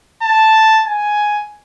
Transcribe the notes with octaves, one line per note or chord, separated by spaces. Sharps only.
A5
G#5